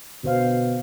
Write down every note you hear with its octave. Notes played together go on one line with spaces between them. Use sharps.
B2 D3 C5 F5